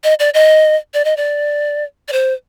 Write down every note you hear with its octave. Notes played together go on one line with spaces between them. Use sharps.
D#5
D5
D#5
D5
D#5
D5
D5
C5